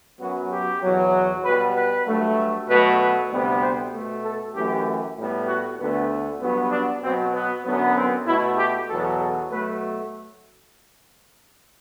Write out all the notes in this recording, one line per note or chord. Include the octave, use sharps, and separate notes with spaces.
F#2 F#3 B3 F#4
G4
E2 B2 F#3
B2 G3 B3 B4
B4
G2 F#3 A3
B2 F#3 A3 B4
B4
D2 C3 G3 B3
C5
B2 A3
A4
F#2 E3 A3 G4
A2 G3 B3
F#4
D2 D3 A3 B3
G2 F#3 B3
D4
B2 F#3 B3 C4
B3
F#2 D3 F#3 B3
C4
B2 A3 E4
G4
E2 B2 F#3 A4
A4
B2 F#3 A3 B4